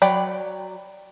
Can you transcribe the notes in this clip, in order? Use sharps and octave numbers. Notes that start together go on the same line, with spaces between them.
F#3 D5 G5 B5